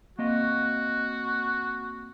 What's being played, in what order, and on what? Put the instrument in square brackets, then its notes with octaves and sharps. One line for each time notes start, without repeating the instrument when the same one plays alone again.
[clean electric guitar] A#3 C4 D#5 [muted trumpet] F#4